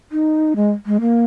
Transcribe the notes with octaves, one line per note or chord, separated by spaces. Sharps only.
D#4
G#3
G#3
A#3